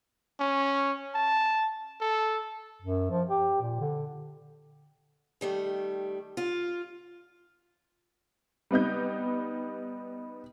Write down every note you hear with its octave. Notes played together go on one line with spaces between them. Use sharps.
C#4
A5
A4
F#2
F3
G4
A#2
D3
D#3 G3 A3
F4
G3 B3 D#4 G6